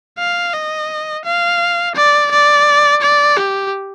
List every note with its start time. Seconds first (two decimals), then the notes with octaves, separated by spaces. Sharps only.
0.19 F5
0.53 D#5
1.25 F5
1.95 D5
2.31 D5
3.02 D5
3.37 G4